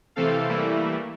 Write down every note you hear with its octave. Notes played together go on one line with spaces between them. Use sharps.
C3 E3 A3 C4 A4 F5
E3 G3 A3 A#3 E4